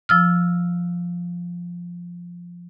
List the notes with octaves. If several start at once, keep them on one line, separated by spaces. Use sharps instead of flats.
F3 E6 F6